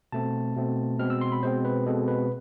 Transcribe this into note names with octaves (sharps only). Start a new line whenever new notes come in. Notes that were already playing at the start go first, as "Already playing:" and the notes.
B2 A3 C4 A5
B2 A3 C4
B2 G#3 C4 F6
E6
C6
B5
B2 G#3 C4 C5
B4
B2 G#3 C4 A4
B4